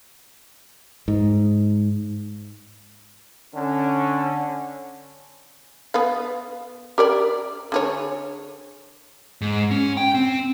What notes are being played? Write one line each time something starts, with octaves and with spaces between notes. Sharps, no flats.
G#2
D3 C#4
B3 B4 F5
G4 A#4 D5
D3 G#4 C#5
G#2
C#4
G5
C4